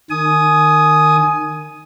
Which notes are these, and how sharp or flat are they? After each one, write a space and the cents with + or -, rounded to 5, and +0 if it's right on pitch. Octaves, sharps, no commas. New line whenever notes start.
D#3 -20 G#5 +20 D#6 +0